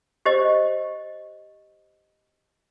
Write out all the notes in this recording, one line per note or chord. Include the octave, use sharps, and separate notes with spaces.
G4 C5 D#5